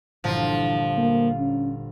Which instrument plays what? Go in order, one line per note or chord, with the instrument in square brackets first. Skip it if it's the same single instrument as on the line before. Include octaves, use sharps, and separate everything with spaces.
[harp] G1 A#2 [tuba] E3 [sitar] F3
[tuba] A#3
C#4